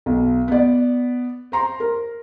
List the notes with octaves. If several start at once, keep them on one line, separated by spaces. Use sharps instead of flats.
B1
B3 D5
C5 A#5 C6
A#4